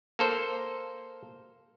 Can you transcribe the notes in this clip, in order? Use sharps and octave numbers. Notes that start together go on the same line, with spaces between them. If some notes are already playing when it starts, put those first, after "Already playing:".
A#3 A4 C5